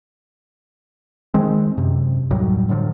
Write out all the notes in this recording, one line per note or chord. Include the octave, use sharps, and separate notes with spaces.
D#3 G#3 C4
F#2 C3
D#2 A2 F#3 G3
A2 D3 F3 F#3